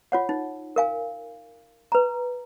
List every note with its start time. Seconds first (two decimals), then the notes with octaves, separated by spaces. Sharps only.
0.12 F4 C#5 F#5
0.29 D#4
0.76 A#4 F5 G#5
1.92 B4 A#5